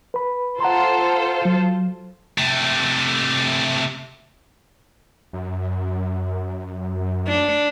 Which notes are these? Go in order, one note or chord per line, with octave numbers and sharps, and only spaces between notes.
B4 B5
F4 A4 C5 F#5 A#5 C6
F#3
C3 A3
F#2
D4